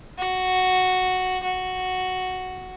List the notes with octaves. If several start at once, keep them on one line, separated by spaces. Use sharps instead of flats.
F#4
F#4